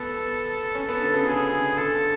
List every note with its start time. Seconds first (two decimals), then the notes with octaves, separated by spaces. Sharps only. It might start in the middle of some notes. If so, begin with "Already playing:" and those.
Already playing: B3 A4
0.75 C#4
0.89 B3
1.01 D3
1.13 C#3
1.26 D3 G#4
1.53 C#3
1.78 D3 A4